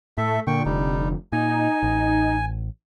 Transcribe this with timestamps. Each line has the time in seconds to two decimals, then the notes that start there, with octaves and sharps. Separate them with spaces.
0.18 A2 A3 A4 E5
0.47 A#2 D3 G5 C#6
0.65 F1 G3 D#4
1.32 A#2 D#4 G#5
1.83 A1